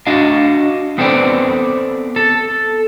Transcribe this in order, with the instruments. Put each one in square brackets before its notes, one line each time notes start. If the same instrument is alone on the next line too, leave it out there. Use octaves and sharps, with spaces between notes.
[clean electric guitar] D4 F#4 D#5 F5
B3 C4 A4 B4 C5 D5
A4